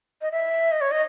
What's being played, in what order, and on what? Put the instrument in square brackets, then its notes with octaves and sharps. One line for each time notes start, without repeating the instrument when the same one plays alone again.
[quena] D#5
E5
D#5
C#5
D#5